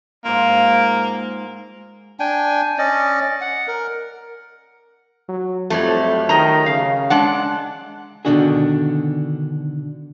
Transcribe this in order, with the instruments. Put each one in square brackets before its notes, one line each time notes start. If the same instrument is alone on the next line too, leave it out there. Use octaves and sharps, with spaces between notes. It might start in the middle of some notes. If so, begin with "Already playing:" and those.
[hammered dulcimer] G#2 F4 [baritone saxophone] A#3
[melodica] D4 G5 G#5
C#4 D5 D#5
F#5
A#4
[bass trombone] F#3
[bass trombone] F2 [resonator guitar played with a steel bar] F#3 G3 A3
[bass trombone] D#3 [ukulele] D#4 D#5 A#5
[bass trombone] C#3 [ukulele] F5
[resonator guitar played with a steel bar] G#3 D4 F#5
[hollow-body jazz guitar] B2 D3 D#3 D4 F#4 G#4